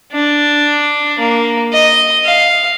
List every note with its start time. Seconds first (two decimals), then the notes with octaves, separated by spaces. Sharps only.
0.12 D4
1.19 A#3
1.73 D#5
2.25 F5